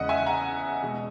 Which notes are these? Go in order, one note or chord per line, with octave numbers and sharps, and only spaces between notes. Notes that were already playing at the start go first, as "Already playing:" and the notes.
Already playing: E2 C#3 G#3 D#5 F#5
E5 G#5
F#5 A#5
B2 G#3